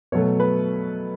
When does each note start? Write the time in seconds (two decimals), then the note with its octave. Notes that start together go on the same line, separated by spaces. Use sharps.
0.12 B2 F#3 A3 C#5
0.40 B4